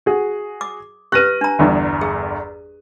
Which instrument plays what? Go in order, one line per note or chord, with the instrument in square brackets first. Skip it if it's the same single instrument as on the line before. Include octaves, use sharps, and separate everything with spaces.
[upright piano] F#4 G#4
[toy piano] D6
[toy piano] G4 B4 [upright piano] F#6 A#6 D#7
[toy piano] D4 A#5
[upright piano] G1 E2 G2
[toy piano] G#4